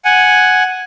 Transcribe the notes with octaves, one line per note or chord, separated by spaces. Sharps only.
F#5 G#5